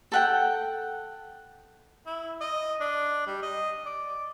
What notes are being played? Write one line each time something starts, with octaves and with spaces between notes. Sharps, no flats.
A4 F#5 G5
E4
D#5
D4
G3
D#5
D5